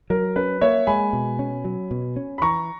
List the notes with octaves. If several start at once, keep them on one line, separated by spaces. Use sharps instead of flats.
F#3 A#4
C#4 B4
A#3 C#5 E5
G#3 G#5 B5
B2
C#4
F#3
B2
C#4
B5
E3 A#5 C#6